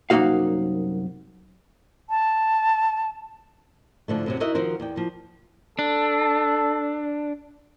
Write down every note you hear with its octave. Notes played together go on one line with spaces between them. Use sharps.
C2 F#2 A#3 D#4 F#4 F5
A5
G#2 D3 F3 A3
F#2 C3 F#3
D#4 E4 F#4 A#4 D#5 E5
D#3 F3 F#4 A#4 C5
E2 D5 G5
F3 A#3
D4 A4